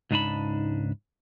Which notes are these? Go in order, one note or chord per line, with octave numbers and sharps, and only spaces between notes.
C#2 G#2 D4 D#4 A5 B5